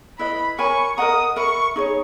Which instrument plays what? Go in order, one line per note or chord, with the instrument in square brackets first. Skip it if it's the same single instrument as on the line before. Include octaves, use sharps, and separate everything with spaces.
[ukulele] E4 B4 D#5 [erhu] B5
[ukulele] A#4 C#5 G#5 B5 [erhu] C#6
[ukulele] A#4 D#5 F#5 A#5 [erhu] D#6
[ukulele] A#4 E5 B5 [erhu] C#6
[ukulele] D#4 G#4 C#5